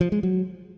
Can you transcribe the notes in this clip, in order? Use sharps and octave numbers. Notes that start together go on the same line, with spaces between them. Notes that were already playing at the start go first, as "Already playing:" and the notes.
F3
G#3
F#3